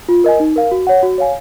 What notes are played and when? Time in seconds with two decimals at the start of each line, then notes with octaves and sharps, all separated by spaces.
0.09 F4
0.24 A#4 D#5 G#5
0.40 D#4
0.56 A#4 F5
0.71 F#4
0.87 C#5 F#5
1.03 F#4
1.18 C#5 F5 G#5